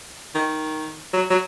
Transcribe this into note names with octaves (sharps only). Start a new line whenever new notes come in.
D#3
F#3
F#3